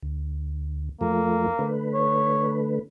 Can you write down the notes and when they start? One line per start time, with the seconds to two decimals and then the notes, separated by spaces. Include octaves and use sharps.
0.03 D2
1.01 F2 F3 A3 A#3
1.59 D3 A3 B4
1.94 C#5